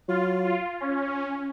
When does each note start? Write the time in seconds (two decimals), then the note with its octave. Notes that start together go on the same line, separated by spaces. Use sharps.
0.08 F#3 F4
0.45 F4
0.81 C#4